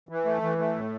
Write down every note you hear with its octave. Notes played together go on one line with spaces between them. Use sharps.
E3
A3
E3
A3
A2